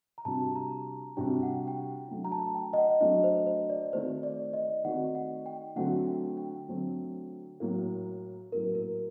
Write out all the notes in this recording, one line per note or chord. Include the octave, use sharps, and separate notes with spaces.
A#5
C3 G3 D4 F#4 A5
A#5
C3 G3 D4 F#4 G5
F#5
G5
G5
F#5
F#3 A3 D4
A#5
A5
G5
D#5
F#5
F#3 A3 D4 D#5
C5
C5
D5
D#3 A3 C4 F#4 C5
D5
D#5
D#3 A3 C4 F#4 F#5
F#5
G5
D3 F#3 A3 C4 F#4 F#5
G5
G5
D3 F#3 A3 C4 F#4
A2 F#3 A#3
A2 F#3 A#3 A#4
A#4